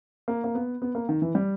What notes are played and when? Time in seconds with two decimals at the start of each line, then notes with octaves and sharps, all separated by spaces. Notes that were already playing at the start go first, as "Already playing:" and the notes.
0.28 A#3
0.44 A#3
0.55 B3
0.82 B3
0.95 A#3
1.09 D#3
1.22 E3
1.35 G3